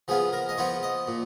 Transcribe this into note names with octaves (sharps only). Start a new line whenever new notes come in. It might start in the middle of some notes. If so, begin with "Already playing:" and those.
F3 B3 F4 G#4
A#4
D#5
F3 B3 F4 C#5
D#5
A#2